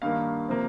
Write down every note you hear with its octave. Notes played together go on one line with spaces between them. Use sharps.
G2 D#3 A#3 F5
C3 F3 A#3